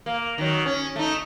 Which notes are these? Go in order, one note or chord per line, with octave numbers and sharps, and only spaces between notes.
A#3
D#3 F#3
C#4
A3 D#4